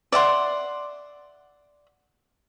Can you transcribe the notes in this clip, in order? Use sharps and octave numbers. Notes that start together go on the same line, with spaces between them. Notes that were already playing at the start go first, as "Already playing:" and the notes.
D5 E5 F#5 C6